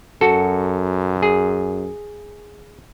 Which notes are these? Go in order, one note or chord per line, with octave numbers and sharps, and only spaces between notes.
F#2 F#4 A4
G#4